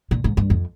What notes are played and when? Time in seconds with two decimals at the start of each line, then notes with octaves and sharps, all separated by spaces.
0.11 A#2
0.24 G#2
0.37 G2
0.50 F2